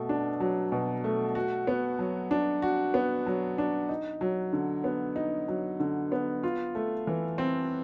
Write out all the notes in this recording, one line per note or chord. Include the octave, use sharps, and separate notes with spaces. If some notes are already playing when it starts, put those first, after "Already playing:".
Already playing: B2 A3
D4
F#3
B2
A3
F#4
B3
F#3
D4
F#4
B3
F#3
D4
D#4
F#3
D3
B3
D#4
F#3
D3
B3
F4
A3
E3
C4